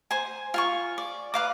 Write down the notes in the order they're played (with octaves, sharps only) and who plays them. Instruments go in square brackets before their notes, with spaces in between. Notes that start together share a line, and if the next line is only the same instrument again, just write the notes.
[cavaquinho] C5 G#5
F4 G#5 C#6
D5
B4 F5 D6